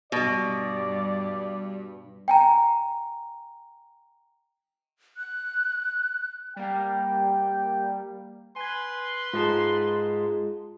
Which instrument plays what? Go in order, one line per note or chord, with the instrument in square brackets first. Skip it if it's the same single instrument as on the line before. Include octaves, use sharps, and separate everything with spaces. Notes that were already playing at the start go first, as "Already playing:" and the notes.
[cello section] G2 [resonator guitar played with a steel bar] B2 [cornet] D5
[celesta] G5 G#5 A#5
[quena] F#6
[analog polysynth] G3 A#3 [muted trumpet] G5
[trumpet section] B4 C6 [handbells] G#5 G#6
[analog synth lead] G#2 [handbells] F4 G#4 A5